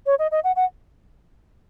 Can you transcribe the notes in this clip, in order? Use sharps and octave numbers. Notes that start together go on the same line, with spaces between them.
C#5
D#5
D#5
F#5
F#5